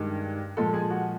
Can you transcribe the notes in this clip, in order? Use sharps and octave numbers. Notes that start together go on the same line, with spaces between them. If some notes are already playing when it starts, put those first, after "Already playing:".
Already playing: G2 D#3 G#3
A#2 F3 G#3 A4
G#4
F#4